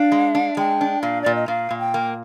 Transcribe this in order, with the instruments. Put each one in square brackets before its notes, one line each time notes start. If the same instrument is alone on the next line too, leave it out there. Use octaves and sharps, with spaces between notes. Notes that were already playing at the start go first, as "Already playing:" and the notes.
Already playing: [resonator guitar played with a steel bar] D4 [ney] F5
[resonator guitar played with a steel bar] G#3
D4
[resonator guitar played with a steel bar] G#3 [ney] G5
[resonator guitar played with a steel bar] D4
[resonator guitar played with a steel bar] A#2 [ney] F5
[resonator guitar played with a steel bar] A#2 [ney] D5
[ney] D#5
[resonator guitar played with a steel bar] A#2 [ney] F5
[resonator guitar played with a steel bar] A#2
[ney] G5
[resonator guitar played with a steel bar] A#3